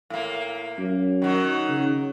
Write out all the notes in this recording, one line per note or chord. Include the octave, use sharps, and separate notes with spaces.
A2 A#3
F#2
D#3 F#3 D#4
C#3